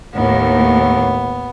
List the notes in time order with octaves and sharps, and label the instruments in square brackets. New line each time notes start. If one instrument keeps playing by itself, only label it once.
[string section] D#2 A2 [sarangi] B3